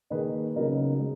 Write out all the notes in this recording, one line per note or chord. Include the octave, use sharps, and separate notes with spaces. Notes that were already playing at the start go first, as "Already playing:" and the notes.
D#3 A#3 D#4 G#4 B4
C#3 F#3 B3 D#4 A#4
G#3